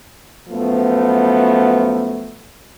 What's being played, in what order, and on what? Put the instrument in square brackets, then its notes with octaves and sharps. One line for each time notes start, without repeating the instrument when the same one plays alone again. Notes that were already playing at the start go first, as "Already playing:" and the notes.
[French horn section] F#2 F3 A3 B3